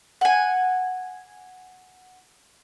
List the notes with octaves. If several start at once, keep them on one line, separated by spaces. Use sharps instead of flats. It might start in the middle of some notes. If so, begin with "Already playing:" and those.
F#5 G#5